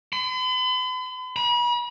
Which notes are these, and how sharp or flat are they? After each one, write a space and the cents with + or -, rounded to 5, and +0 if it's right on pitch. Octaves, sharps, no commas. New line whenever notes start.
B5 +45
B5 -40